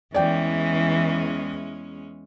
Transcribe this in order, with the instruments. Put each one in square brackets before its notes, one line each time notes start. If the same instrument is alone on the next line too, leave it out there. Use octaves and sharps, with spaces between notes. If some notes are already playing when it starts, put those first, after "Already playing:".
[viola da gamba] E2 G#3 C#4 [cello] E3 [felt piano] D5 G5